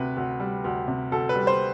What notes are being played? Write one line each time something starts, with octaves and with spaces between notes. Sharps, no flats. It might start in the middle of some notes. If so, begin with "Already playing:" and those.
Already playing: D2 C3 B4
D2
G3
D2
C3
D2 A4
B4
G3
C5